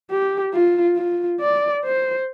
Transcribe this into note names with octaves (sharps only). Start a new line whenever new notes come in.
G4
F4
F4
D5
C5